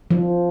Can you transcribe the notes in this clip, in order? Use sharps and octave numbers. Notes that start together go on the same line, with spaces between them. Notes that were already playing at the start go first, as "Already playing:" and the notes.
F3